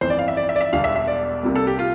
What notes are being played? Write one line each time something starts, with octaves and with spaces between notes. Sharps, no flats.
G1 F2 E3 C5
D5
F5
E5
D5
E5
D5
E5
E1 E2 D3 G3 F5
E5
E5
D5
C2 C3 G3 A#3
A4
G4
F4